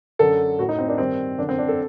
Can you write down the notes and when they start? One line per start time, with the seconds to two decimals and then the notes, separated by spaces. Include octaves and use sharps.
0.19 F#2 D3 A4
0.59 A2 F#4
0.69 D#4
0.79 C4
0.89 D4
0.98 G2 D#3 C4
1.38 F#2 D3 D4
1.49 C4
1.58 D4
1.68 A4